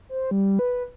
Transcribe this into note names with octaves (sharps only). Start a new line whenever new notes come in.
C5
G3
B4